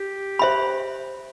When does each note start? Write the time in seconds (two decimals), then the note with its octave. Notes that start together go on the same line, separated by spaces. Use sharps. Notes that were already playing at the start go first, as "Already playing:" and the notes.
Already playing: G4
0.39 C5 E5 B5